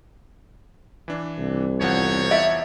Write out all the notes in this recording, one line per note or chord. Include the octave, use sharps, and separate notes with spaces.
E3 D4
C2
E2 F3 C#5 F#5
D5 E5